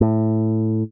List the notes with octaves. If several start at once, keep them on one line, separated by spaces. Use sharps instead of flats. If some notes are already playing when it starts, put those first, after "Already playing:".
A2